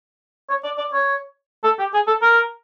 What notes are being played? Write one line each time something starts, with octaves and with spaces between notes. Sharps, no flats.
C#5
D5
D5
C#5
A4
G4
G#4
A4
A#4